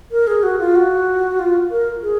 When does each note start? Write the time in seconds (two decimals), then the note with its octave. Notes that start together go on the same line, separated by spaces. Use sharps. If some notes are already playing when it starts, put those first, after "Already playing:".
0.11 A#4
0.27 G#4
0.43 F#4
0.59 F4
0.75 F#4
1.39 F4
1.71 A#4
2.02 G#4